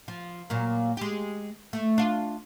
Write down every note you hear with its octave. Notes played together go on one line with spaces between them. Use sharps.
F3
A#2 F#3 A#3
G#3 G4
A3
D4 F4